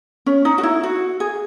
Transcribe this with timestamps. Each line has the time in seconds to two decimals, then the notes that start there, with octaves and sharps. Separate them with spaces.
0.26 C#4
0.45 D#4
0.58 F#4
0.63 E4
0.83 F#4
1.20 G#4